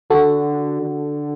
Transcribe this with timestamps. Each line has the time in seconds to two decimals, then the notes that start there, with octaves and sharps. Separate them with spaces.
0.10 D3 F#4 A4
0.82 D3